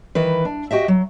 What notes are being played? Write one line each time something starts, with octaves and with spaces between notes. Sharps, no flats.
D#3 E3 B4
D4
F#4 G4 D#5 E5
F#3